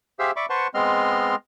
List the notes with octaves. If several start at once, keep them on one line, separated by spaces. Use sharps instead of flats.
G4 G#4 C5 E5 F5 E6
D5 E5 B5 C#6 D6
B4 C5 F#5 A5 C6 C#6
G#3 B3 C4 D#5 C6 F6